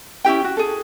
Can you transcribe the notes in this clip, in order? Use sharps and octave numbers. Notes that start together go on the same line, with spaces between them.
C#4 E4 G4 G5
F#4
G#4 A4